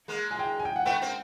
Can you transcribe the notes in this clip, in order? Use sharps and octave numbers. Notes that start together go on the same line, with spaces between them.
G#3 A#3
G#5
G5
G#5
G5
F#5
A3 B3 G5
A#3 C4